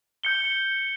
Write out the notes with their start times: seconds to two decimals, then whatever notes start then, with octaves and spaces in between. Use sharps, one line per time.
0.23 G6 C#7 G7